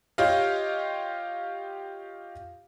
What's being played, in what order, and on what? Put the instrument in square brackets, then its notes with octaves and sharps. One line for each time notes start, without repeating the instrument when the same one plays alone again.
[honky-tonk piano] F4 G4 C#5 D#5 F5